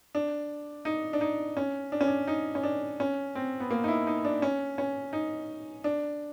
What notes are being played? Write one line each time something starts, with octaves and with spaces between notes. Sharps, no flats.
D4
D#4
D4
D#4
C#4
D4
C#4
D4
D#4
C#4
D4
C#4
C4
B3
A#3
D#4
E4
D#4
D4
C#4
C#4
D#4
D4